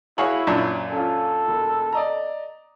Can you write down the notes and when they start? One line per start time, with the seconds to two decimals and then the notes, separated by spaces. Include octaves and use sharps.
0.18 E4 F#4 G#4 C#5 F5 F#7
0.47 F#2 A#2 D4 C#5
0.92 C#4 F4 A4
1.48 E1
1.93 D5 D#5 A#5